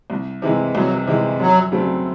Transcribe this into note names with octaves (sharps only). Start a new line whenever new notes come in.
C2
C3 E3 G#3
C2 F#3
C3 E3 G#3
F#2 F#3
C#3 F#3 A3 C4